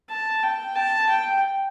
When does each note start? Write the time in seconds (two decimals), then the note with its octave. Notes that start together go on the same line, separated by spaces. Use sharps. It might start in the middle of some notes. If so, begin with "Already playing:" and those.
0.10 A5
0.43 G5
0.75 A5
1.09 G5